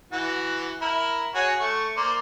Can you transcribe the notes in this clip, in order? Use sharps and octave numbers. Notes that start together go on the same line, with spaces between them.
E3 F#4
E4 A#4
F#4 G#4 C#5
A3 C#6
A#3 C5 D5